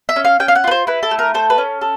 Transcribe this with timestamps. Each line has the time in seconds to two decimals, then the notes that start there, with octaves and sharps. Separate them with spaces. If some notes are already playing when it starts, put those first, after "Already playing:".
0.09 E5
0.16 C#4
0.25 F5
0.40 C#4 G5
0.48 F5
0.55 F#5
0.64 F4 B4
0.71 C5
0.87 E4 B4
1.03 A4
1.11 A3
1.19 A#4
1.34 A4 C5
1.50 B4
1.58 C#4
1.81 A4